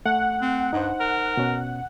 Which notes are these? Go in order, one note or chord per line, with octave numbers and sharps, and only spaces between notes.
A3 F#5
C4
G2 D#4 C5
A#4
B2 C#4